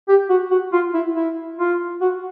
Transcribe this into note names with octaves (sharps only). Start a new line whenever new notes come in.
G4
F#4
F#4
F4
E4
E4
F4
F#4